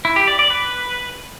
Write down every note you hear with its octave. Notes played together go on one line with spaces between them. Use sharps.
E4
G4
D5
D5
B4